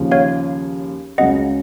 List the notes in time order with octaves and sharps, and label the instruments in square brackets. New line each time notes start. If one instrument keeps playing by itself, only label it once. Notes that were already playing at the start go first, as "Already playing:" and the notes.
Already playing: [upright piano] D#2 C#3 F3
[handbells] C#5 F5
[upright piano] C#2 C#3 F#3 [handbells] D#5 F#5